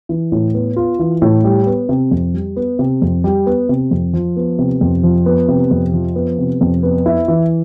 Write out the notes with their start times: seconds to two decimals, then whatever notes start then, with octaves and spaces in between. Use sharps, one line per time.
0.09 E3
0.32 A2
0.54 B3
0.76 F4
0.99 E3
1.22 A2
1.44 G3
1.67 B3
1.89 C3
2.11 F2
2.34 G3
2.56 B3
2.79 C3
3.02 F2
3.24 G3
3.46 B3
3.69 C3
3.91 F2
4.13 F3
4.36 B3
4.59 C3
4.81 F2
5.03 F3
5.26 B3
5.48 C3
5.71 F2
5.93 F3
6.16 B3
6.39 C3
6.61 F2
6.83 B3
7.06 E4
7.28 E3